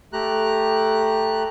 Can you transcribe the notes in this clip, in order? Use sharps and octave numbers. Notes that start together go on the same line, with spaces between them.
A3 G4 A#5 F#6